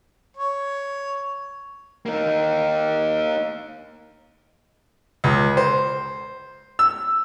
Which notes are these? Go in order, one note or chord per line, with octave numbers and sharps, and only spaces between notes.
C#5
A#3 D#4
C#2
C5
E6